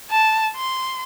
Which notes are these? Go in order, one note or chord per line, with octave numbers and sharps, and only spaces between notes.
A5
C6